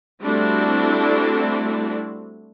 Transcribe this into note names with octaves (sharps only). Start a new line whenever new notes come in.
G3 A3 C4 D4 E4 F#4